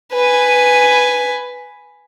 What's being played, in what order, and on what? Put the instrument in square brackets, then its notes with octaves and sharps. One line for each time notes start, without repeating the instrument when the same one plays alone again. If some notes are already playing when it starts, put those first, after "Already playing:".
[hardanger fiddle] B4 G#5